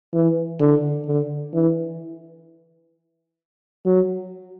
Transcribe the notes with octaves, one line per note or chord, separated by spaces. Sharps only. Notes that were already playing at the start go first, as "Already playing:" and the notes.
E3
D3
D3
E3
F#3